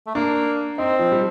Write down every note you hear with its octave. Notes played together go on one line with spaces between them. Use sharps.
A3
A#3 D4
C4 D#4
F3
G3